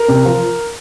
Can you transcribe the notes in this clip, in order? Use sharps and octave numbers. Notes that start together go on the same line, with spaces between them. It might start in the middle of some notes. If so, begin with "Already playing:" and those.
Already playing: A#4
C3
F3